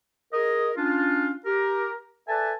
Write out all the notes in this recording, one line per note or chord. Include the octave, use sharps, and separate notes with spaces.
G#4 A#4 D#5
C#4 D4 F4
G4 A#4
A4 B4 D5 E5 G#5 A5